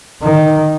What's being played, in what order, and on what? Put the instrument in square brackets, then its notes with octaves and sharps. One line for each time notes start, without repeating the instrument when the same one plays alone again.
[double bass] D#3